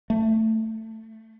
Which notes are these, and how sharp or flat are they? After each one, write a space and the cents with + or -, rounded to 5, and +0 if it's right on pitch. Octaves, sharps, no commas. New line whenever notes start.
A3 +10